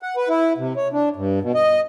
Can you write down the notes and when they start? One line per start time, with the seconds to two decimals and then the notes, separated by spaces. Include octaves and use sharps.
0.02 F#5
0.17 B4
0.29 E4
0.58 C3
0.76 C#5
0.93 D4
1.16 G2
1.42 B2
1.55 D#5